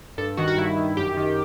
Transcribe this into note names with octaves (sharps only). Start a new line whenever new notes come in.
G2 A4
D#3 F#4
F#4
G2 E4
D#3
F#2 G4
D#3